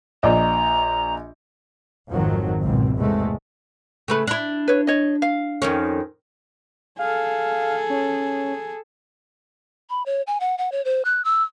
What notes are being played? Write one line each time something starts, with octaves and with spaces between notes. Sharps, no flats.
A#1 D5 D#5 A#5
G#1 F2 D#3 F3 F#3
G#1 C#2 B2 C4
E2 C3 G#3 A3
C#3 A3 B4
D4 E4
B4 C#5
C#5 D#5
F5
F2 D#3 C#4
G#4 A4 F5
C#4
B5
C#5
G#5
F#5
F#5
C#5
C5
F#6
E6